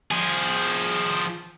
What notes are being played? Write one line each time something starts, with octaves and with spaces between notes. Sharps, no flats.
F3 G#4